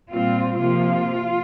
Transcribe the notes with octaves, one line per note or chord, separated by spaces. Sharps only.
A#2 G3 C4 F4
C3 F3 A#3 F4